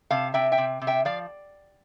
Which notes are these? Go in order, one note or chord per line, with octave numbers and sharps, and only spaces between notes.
C3 F5 A5
C3 E5 G5
E5 G5
C3
C3
E5 G5
F3 D5 F5